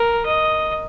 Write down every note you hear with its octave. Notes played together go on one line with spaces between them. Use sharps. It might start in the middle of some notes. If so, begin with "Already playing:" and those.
Already playing: A#4
D#5